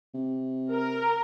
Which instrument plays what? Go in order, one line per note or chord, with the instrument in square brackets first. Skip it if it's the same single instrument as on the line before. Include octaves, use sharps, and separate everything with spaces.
[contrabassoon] C3
[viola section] A#4